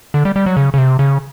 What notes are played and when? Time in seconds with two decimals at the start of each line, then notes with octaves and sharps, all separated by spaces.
0.14 D3
0.25 G3
0.36 G3
0.46 F#3
0.57 C#3
0.74 C#3
0.78 C3
0.99 C#3